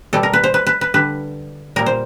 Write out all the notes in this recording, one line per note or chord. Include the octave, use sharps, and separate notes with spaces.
B2 G3 A4
A#4
B4
C5
B4
B4
B4
D3 G3 B4
A#2 G3 A#4
C5